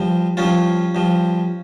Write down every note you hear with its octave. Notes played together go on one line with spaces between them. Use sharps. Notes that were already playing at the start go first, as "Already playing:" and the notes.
Already playing: G2 F3
G2 F3 C#4 F4
G2 F3